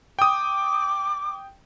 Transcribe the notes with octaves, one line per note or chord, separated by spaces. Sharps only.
G5 D6 D#6